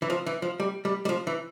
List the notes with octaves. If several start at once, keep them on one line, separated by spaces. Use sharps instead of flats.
E3
F3
E3
F3
G3
G3
G3
F3
E3